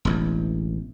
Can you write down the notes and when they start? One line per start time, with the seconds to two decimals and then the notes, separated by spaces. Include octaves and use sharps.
0.05 E1 A1 E2